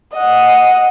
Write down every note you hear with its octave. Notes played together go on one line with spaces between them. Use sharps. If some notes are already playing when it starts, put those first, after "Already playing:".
D#5 F#5